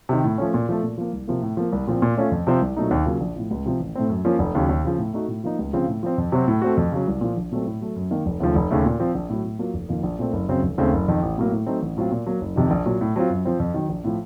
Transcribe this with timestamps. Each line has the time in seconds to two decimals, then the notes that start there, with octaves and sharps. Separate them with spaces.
0.09 C3 D#3
0.24 A2
0.38 F3 A3 C#4
0.54 A#2
0.69 F3 A3
0.83 A#2
0.98 F3 A#3
1.13 C2
1.28 C3 F3 A#3
1.42 A2
1.57 F3 A#3
1.73 C2
1.87 A#2 F3 C4
2.02 A#2
2.17 A3 C#4 F4
2.32 F2
2.47 C3 F3 C4
2.61 C2
2.77 A#2 F#3 A3 D#4
2.91 D#2
3.05 C#3 F#3 A#3 F4
3.21 A#1
3.36 A2 F3
3.51 C#2
3.65 C3 F3 C4
3.80 A1
3.95 A2 A3 C4
4.10 F#2
4.25 F3 A#3 C#4 F4
4.39 F1
4.55 D#2 C#3 F#3
4.69 D#2
4.84 C#3 F3
4.98 A2
5.14 A3 D#4 F#4
5.28 A2
5.44 F3 A#3 D#4
5.59 C#2
5.73 C#3 F3 C4 F4
5.88 A2
6.03 F3 C4
6.18 F2
6.32 C3 F#3 C4 F#4
6.48 A2
6.62 A3 C4 F#4
6.77 F2
6.92 C#3 F#3
7.07 C2
7.21 A#2 F3
7.37 A#1
7.52 A#2 F#3 A3 C4
7.66 A2
7.81 F#3 A3
7.96 F#2
8.11 D#3 A#3
8.26 F1
8.40 D#2 C#3 F3 A3
8.55 F1
8.71 D#2 C#3 A3
8.85 A#2
9.00 F3 C4
9.15 A#1
9.30 A2 F#3
9.44 A2
9.59 F#3 A#3 F4
9.74 F1
9.89 F2 D#3 A#3 F4
10.03 A#1
10.19 A#2 A3 C4
10.33 F#1
10.49 F#2 C#3 F#3 C4
10.63 F1
10.78 D#2 C#3 A3 C4
10.93 F#1
11.08 F2 D#3
11.23 A1
11.38 A2 F#3 A#3
11.52 A2
11.67 F#3 A3 C4 D#4
11.82 A1
11.97 A2 F#3 C4 F4
12.11 A#2
12.27 F#3 A#3
12.41 F#1
12.56 F2 C3 D#3
12.70 A#1
12.86 A#2 F#3
13.01 A2
13.16 F#3 C4 F4
13.30 F#2
13.45 F3 C4
13.60 F2
13.74 D#3 F#3
13.89 A#1
14.04 A2 F3